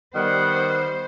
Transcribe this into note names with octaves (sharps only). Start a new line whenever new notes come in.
D#3 G3 B3 C5 F#5